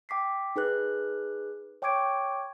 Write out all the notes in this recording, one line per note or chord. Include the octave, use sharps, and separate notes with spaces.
G5 D6 B6 C7
D#4 G#4 B4 F#6
C#5 G5 C#6 D6 G#6 D7